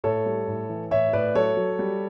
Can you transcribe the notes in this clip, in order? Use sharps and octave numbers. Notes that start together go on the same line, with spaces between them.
A2 A4 C#5
G3
A2
E3
A2 C#5 E5
A2 B4 D5
F#3 A4 C#5
F#3
G3